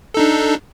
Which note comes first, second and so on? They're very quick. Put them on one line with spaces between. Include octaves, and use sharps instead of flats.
A4 D#4 D4